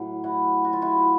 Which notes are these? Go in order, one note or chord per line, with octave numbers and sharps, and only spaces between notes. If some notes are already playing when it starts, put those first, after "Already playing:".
Already playing: A2 F#3
E4 F#4
F#4
F4
E4 F#4